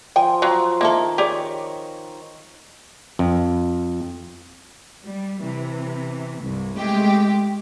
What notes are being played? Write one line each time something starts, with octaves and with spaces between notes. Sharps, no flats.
F3 G5 G#5
F#3 A#5 C6
D#3 A#3 E4 A4
G4 G#4 C#5 D5
F2
G3
C3 E3
C2 G2
G#3 A3 G4